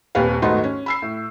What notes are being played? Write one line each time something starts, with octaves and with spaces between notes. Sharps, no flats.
D#1 D#2 C3 B4 F5
G#1 A3 B3 D#4 F#4 C6
C#4
B5 E6 C7
A2